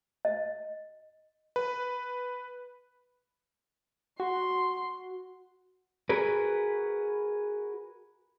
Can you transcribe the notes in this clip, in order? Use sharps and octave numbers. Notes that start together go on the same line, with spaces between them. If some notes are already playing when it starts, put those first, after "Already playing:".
D#5
B4
F#4 C6
F#4 G#4 A#4 B4